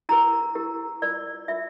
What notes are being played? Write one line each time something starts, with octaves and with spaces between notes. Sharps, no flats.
E4 G4 A#4 A#5
E4 G4 A#4
F4 A#4 D5
F4 A#4 E5